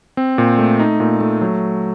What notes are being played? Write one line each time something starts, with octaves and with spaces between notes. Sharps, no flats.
C4
A#2
A3
D#4
A#2
A3
F#3